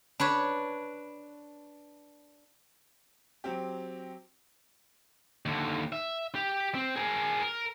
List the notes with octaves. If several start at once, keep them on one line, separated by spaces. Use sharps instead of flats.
D4 B4 C#5
F#3 C4 G4
D#2 D3
E5
G4
C4
G#4 A#4
A#4